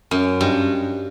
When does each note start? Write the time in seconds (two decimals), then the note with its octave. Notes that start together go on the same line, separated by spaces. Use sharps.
0.11 F#2
0.41 G2